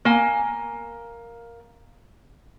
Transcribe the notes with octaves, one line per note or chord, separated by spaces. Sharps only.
A#3 G#5